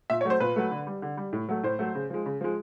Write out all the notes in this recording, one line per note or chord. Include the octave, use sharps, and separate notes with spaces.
A#2 E5
C#5
F#3 A3 C5
A#2 B4
F#3 A3
D3
G3
D3
G3
A2
F#3 A3
A2 C5
F#3 A3
C#3
F3 G#3
C#3
F3 G#3